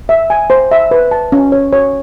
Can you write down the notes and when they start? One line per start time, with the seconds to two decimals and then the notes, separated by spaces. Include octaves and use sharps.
0.09 E5
0.30 G#5
0.50 C5
0.71 E5
0.91 B4
1.11 A5
1.32 C#4
1.52 C#5
1.73 C#5